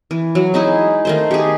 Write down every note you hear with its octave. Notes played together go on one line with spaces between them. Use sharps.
E3
F#3
G#3 D#4 E4 G#4
D#3 A3 C5
G4 G#4